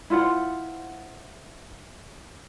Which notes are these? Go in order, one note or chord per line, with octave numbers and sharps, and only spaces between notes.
E4 F4 C5 F#5